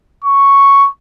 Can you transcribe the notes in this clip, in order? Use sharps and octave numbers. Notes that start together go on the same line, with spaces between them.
C#6